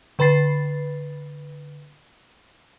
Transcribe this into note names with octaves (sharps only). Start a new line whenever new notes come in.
D3 B4 B5 A6 C7